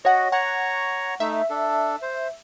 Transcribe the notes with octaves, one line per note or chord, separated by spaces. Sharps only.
F#4 C#5 D#5 F#5
C#5 F#5 A#5 C#6
A3 D#4 E5
D4 A4
C5